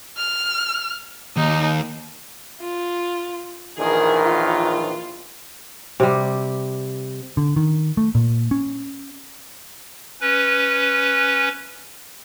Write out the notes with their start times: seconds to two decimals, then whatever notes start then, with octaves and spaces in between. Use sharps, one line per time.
0.18 F6
1.37 D#2 D#4
2.61 F4
3.78 A#1 D#3 E3 G#4 A#4
4.23 F4
6.00 C3 G3
7.37 D3
7.56 D#3
7.97 A3
8.15 A#2
8.51 C#4
10.21 C#4 B4